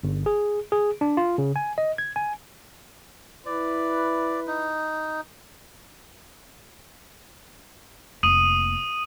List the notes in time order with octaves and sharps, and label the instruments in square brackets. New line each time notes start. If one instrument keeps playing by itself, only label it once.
[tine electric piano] G1
G#4
G#4
D4
F4
C#3
G#5
D#5
G#6
G#5
[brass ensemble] E4 B4 [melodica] D5
[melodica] D#4
[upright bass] F1 A#3 [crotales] D#6 D#7 F#7